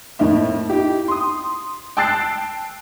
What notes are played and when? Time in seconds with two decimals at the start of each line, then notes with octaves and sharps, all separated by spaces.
0.19 F2 A2 A#3 D#4 E5
0.69 D#4 E4 G4
1.08 C6 D#6
1.97 G5 A5 E6 F#6 A6 C7